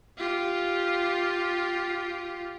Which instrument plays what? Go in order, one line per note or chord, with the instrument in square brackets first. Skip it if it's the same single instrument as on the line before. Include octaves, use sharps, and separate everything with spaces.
[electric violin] F4 G4